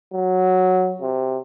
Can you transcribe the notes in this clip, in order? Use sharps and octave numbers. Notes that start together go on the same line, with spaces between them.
F#3
C3